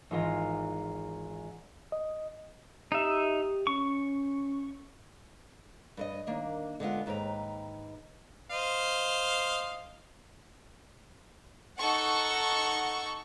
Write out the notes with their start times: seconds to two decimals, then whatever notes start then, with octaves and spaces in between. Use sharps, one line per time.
0.11 G#1 E3 G#3 F4 A#5
1.92 D#5
2.92 D#4 G4 E5
3.67 C#4 C#6
5.97 G2 B4 D#5
6.27 D#3 A#3 D4
6.80 D3 G#3 B3 F4
7.06 D#2 G#2 B4 G5 A#5
8.50 C5 D#5 F5
11.77 D#4 A4 F#5 C#6